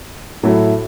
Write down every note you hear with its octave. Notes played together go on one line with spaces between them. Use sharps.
A2 F#3 A3 E4